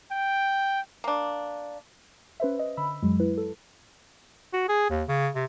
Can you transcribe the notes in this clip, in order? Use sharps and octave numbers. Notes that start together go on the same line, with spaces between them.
G5
A#3 D4
C#4 B4 C5 E5
D#5
D3 B5 E6
F#2 F#3 G#3
E4 B4
A4
F#4
G#4
D#2
C#3
C3